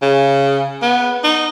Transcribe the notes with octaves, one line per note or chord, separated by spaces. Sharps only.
C#3
B3
D#4